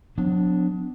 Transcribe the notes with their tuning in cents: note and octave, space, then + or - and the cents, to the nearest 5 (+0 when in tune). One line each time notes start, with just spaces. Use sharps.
F#3 -40 B3 +30 D4 +0